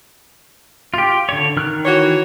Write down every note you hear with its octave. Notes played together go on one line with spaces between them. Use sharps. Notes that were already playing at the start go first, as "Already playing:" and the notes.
F4 G4
D3 C#5
D#3 F6 F#6
E3 F#4 C#5